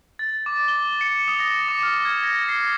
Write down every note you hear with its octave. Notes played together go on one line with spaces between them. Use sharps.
A6
D6
G7
C#7
D#6
A#6
D6
F6
G#6
A#6
C7